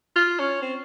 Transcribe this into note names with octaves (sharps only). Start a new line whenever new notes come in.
F4
C#4
C4